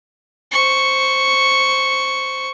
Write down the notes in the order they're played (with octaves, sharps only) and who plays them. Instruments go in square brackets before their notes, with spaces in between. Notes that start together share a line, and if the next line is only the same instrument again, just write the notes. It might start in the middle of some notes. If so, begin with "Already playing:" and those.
[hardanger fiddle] C5 C#6